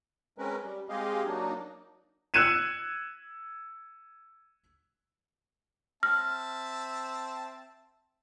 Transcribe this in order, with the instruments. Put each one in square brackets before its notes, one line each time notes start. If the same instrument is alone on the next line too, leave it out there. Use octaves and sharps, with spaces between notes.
[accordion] G#3 C4 C#4 A#4 B4
G3
G#3 C4 G4 G#4 D#5 F5
F#3 A#3 D4 D#4
[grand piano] E6 F#6 G#6 C#7 D#7 E7
[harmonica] C4 E5 A5 [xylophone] F6